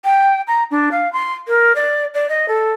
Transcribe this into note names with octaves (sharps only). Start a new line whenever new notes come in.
G5
A#5
D4
F5
C6
A#4
D5
D5
D#5
A4